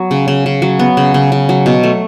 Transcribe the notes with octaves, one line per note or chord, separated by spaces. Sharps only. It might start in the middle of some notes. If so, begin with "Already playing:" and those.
Already playing: F#3 B3
C#3
C#3
C#3
F#3
B3
C#3
C#3
C#3
F#3
B2
A3